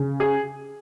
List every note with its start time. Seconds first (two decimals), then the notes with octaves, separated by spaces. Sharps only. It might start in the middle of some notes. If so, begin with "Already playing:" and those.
Already playing: C#3
0.20 G#4